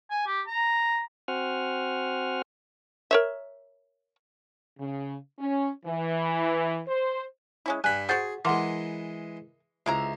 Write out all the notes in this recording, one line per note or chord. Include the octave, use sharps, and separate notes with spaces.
G#5
G4
A#5
C4 F#4 C5 F#5 G#5 F6
A#4 C#5 E5
C#3
C#4
E3
C5
G#3 C#4 E4
G2 G#5 B5 F#6
F#4 G#4 C5 F#5 G6 A6
E3 G#3 A#4 F#5 C6 D6
C#2 C3 E4 A#5